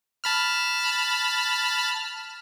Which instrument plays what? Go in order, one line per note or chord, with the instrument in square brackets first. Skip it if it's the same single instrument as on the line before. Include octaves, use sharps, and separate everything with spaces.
[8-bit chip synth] A5 B5 F6